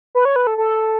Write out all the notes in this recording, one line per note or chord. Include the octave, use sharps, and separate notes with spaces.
B4
C#5
B4
A4
A4